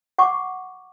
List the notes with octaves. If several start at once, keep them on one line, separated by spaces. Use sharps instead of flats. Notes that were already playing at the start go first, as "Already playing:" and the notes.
F#5 C#6 D6